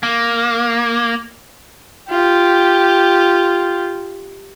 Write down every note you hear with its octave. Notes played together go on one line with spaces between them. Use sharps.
A#3
F4 G4